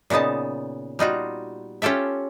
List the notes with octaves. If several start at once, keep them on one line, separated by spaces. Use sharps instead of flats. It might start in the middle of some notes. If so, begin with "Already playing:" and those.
A#2 C#3 B3 D#4 A5
G3 D#4 F4 F#4
C#4 F4 G4 A4 E5